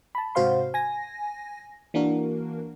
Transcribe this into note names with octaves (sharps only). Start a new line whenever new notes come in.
A5 B5
G#2 C3 F#4 C5 F5 C6
G#5 A#6
E3 A#3 D4 F#4 A#4